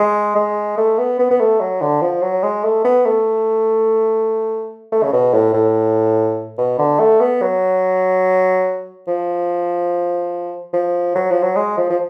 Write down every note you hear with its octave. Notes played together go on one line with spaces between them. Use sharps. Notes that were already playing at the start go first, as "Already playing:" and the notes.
Already playing: G#3
G#3
A3
B3
B3
B3
A3
F#3
D3
F3
F#3
G#3
A3
B3
A3
A3
C#3
B2
A2
A2
B2
D3
A3
B3
F#3
F3
F3
F#3
F3
F#3
G#3
F3
F3